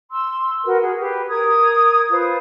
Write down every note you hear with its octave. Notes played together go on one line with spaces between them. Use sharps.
C6 E6
F#4 A#4 B4
F#4 G#4
G4 B4
A#4 D#6 G#6
F4 B4 C5